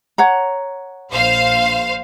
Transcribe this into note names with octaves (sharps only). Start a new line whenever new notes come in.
C#5 F#5 A#5
A#1 C5 F5